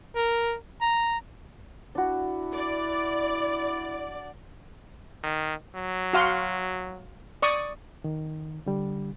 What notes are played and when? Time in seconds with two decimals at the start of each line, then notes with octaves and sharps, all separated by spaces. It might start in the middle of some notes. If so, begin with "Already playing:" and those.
0.16 A#4
0.82 A#5
1.95 D4 E4 F#4
2.54 D5
5.23 D#3
5.75 F#3
6.13 F#4 F5 C6
7.42 D5 C#6 D#6
8.04 D#3
8.66 D3 G3